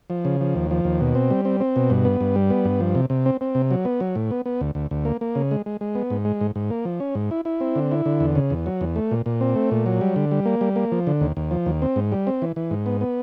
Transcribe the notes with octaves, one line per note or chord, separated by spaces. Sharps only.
F3
C#3
F3
D#2
F3
D#2
B2
C4
G3
C4
C4
B2
G2
B3
G2
G3
B3
G2
F3
C3
C3
C4
C4
C3
F#3
B3
F#3
A2
B3
B3
D2
D2
D2
A#3
A#3
C#3
G#3
G#3
G#3
B3
G#2
G#3
G#2
G#2
A#3
F3
C#4
G#2
E4
E4
C4
D3
E4
D3
E2
C#3
E2
F#3
E2
A3
A#2
A#2
C4
A3
A#2
F#3
G3
D3
G3
A#3
G3
A#3
F3
D3
D#2
D#2
F3
D#2
C4
G#2
G3
C4
E3
E3
G#2
B3
B3